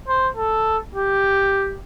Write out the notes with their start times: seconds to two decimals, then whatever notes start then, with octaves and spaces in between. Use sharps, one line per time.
0.08 C5
0.37 A4
0.95 G4